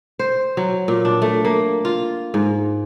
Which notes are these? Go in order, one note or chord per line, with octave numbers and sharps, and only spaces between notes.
C5
F#3
A#2
D4
A3
A#3
F4
G#2